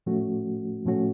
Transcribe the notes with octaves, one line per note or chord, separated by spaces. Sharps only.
A2 F3 A3 C#4 F#4
A2 F3 A3 C#4 F#4